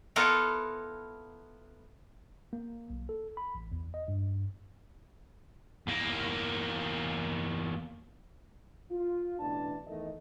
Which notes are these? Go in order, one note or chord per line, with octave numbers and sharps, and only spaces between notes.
B3 E4 F4 A4 A#4 C#5
A#3
B1
A4
B5
A1
E2
D#5
G2
E2 A#3
F4
A1 B2 E3 D4 A5
E2 D#3 A3 D#5